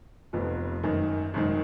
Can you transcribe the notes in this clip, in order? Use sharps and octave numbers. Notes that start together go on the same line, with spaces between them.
F1 F2 F3 B3
G#1 F#2 D#3
G#1 F#2 D#3